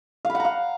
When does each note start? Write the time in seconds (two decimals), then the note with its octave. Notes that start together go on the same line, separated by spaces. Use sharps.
0.25 F5
0.30 B5
0.35 F#5
0.40 A#5
0.45 F5